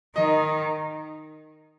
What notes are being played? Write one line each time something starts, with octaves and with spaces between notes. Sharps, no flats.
D#3 D#5